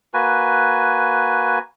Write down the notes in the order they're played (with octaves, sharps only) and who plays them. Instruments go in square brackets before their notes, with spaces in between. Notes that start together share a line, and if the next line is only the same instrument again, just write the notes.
[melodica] A#3 F#4 B4 G#5